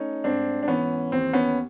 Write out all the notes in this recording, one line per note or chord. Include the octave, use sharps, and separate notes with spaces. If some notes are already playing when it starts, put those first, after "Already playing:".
Already playing: A3 C#4 D#4
G#2 C4 D4
D4
E3 B3 C#4
D#2 C4
B3 C#4